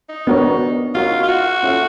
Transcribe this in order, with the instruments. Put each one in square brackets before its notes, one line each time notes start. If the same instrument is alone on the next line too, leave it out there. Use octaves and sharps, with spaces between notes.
[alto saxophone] D#4
[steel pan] B3 D4 F#4 A#4 C#5
[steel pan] D#4 F#4 A#4 C#5 [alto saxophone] F4
[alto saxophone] F4
F#4
[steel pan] C#4 F4 A4 C#5 E5